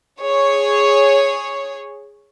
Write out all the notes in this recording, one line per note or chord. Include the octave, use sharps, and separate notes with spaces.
G#4 C#5